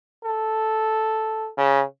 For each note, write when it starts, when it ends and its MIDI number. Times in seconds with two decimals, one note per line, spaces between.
0.24 1.49 69
1.57 1.83 49